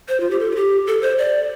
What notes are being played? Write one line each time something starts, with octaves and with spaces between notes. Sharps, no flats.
C5
F4
G4
A4
F4
G4
A4
C5
D5